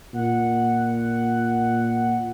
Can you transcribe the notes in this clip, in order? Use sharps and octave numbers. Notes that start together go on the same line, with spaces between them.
A#2 F#5